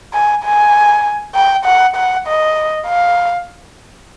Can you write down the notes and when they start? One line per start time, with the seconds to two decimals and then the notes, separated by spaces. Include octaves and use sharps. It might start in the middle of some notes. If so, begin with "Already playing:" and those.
0.14 G#5
0.44 G#5
1.35 G5
1.65 F#5
1.96 F#5
2.27 D#5
2.87 F5